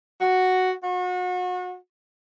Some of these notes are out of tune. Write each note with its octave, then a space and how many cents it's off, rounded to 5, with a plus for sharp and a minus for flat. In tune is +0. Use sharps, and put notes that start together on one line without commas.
F#4 +0
F#4 -35